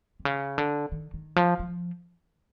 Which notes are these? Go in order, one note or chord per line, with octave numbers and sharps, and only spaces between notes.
C3
C#3
D3
D#3
D#3
F3
F3